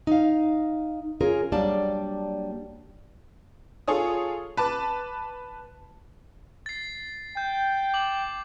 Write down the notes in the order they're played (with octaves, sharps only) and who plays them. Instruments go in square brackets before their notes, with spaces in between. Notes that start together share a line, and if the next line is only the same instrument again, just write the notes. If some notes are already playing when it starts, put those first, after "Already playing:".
[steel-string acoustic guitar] D#4 F5
C#4 F4 G#4 A#4
F#3 G3 A#3 D4 D5 A5
[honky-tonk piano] F4 G#4 A4 C#5 D#6
B4 A5 D6
[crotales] A6 C7
[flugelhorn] G5 [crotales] G6
[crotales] D6 F#7